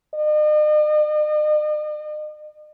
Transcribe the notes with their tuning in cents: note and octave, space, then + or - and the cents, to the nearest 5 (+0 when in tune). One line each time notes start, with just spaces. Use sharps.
D#5 -45